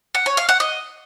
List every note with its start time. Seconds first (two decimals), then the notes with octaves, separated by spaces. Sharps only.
0.15 F#5
0.26 C#5
0.37 F5
0.49 F#5
0.60 D#5